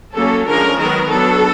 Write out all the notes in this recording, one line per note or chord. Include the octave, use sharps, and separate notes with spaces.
F#3 A#3 C#4 A4
D3 F3 G#3 C#4 A#4
D#3 F#3 B3 A#4
F#3 B3 D4 A4